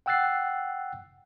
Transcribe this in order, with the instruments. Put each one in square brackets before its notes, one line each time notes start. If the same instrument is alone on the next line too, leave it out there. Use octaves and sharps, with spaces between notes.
[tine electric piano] F#5 G5 E6 F#6 A6 C7